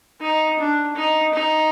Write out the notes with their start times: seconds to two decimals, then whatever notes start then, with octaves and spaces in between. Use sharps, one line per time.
0.21 D#4
0.59 D4
0.95 D#4
1.33 D#4